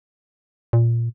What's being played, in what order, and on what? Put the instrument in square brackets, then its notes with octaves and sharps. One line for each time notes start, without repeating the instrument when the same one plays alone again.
[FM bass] A#2